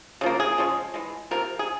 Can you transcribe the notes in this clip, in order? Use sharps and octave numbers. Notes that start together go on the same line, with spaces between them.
C#3 F3 A#3
G#4
C#3 F3 G#3
E3 G#3
C3 F3 A#3 A#4
G#4